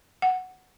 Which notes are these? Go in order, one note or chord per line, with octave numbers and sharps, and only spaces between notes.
F#5